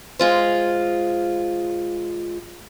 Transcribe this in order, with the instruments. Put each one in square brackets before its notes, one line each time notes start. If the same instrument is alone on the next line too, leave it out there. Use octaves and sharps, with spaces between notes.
[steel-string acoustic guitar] G#3 F4 C5